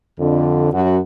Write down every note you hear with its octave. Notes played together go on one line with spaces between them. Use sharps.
F2 D3
F#2 F#4